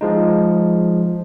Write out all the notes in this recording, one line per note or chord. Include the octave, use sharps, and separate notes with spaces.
F3 G#3 D#4